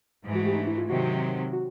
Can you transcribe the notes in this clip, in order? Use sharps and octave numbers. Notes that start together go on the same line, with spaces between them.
G#2 E3 A3
F#4
G4
D#4
D4
E4
F4
C3 D#3 F#3 F#4
F#4